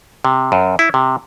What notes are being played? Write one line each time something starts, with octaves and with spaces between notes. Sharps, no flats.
C3
F#2
E4
C3